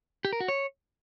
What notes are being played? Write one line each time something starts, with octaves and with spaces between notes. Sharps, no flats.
G4
A#4
F#4
C#5